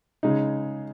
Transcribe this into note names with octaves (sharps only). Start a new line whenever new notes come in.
C#3 G#3 D#4